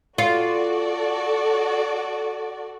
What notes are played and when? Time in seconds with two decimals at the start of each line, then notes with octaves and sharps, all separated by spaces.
0.18 F4 F#4 A4 D5